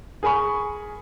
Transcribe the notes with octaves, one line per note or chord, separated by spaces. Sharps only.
G#4 A#4 G#5 B5 C#6